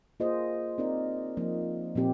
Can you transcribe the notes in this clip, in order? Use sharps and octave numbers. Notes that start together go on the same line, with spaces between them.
A#3 F4 G#4 C5 D#5
C4 D#4 A#4 D5
F3 A#3 D#4
A#2 F3 C4 G4